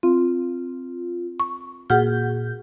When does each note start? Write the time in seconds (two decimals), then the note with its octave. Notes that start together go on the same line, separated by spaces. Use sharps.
0.03 C4 F4
1.40 C#6
1.90 A#2 F#4 G#4 F#5 F6 G6